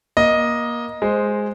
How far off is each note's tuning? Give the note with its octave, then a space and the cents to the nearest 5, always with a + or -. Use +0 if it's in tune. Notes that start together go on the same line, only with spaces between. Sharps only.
A#3 +25 D#5 +0
G#3 +0 C5 +0